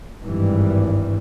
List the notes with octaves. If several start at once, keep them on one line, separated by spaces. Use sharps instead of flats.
G#1 G2 E3 G3